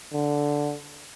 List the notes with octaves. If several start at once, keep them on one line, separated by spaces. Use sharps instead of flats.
D3